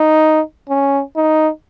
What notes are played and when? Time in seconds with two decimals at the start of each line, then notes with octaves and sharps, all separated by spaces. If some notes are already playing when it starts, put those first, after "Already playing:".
Already playing: D#4
0.69 C#4
1.16 D#4